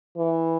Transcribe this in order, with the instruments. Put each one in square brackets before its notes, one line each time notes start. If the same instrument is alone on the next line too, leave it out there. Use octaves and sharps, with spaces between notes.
[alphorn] E3